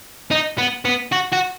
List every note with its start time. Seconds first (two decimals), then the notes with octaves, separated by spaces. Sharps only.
0.31 D#4
0.58 B3
0.85 B3
1.12 F#4
1.32 F#4